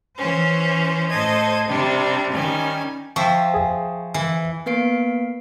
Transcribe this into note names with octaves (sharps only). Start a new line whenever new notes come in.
E3 C#4 C5
A2 A4 C5 D#5 G#6
C3 G3 D4
D#3 G3 C#4 G#5
F3 E5 G5 C#6
G#4
E3
A#3 B3 B4 F5 C7 D7